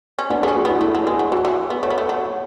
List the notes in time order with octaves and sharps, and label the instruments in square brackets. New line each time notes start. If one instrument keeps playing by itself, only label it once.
[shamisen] C#4
[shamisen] B3 [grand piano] D4
[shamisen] B3 [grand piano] G#4
[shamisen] C#4
[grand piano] F#4
[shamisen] B3 [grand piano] E4
[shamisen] A3 [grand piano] E4
[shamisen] F#3
[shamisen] G#3 [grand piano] G#4
[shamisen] F#3
[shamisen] E3 [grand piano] F#4
[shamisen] E3
B3
[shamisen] A3 [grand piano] C#5
[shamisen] B3
A3
F#3